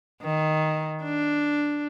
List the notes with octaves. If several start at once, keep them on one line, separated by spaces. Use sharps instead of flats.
D#3
D4